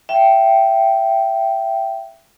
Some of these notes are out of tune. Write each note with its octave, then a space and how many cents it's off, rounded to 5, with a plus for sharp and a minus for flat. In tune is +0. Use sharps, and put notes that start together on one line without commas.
E5 +20 G5 -10